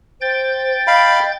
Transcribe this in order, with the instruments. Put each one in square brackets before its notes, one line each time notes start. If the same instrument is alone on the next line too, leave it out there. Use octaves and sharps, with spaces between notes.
[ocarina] C5 [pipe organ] G5 G6 A6
[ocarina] D#5 [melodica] F5 B5